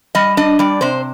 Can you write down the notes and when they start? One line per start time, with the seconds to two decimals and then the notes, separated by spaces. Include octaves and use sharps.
0.15 G3 D#5
0.37 D4 D#5
0.59 G3 D5
0.81 C3 C5